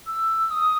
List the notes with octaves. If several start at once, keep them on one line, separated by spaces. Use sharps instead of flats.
E6
D#6